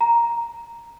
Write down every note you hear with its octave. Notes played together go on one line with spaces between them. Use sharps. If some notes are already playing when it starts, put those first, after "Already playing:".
A#5